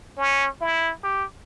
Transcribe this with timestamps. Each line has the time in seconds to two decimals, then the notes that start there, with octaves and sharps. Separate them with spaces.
0.18 C#4
0.61 E4
1.04 G4